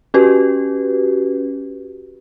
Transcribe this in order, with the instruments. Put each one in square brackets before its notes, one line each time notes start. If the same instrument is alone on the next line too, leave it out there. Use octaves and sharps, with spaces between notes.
[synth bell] C#4 F#4 G4 B4